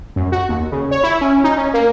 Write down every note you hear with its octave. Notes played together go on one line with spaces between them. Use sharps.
F#2
F#4
D#2
C#3
C#5
E4
C#4
D#4
C#4
A#3